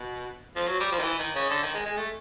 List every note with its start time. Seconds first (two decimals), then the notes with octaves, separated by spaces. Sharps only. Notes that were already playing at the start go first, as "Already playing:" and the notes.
Already playing: B2
0.56 F3
0.68 F#3
0.80 G3
0.92 F3
0.99 D#3
1.03 E3
1.19 D#3
1.35 C#3
1.50 D3
1.63 D#3
1.75 G#3
1.86 G#3
1.97 A3